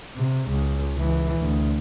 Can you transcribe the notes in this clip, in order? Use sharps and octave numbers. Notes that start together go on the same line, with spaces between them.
C3
C#2
C#2 E3
D2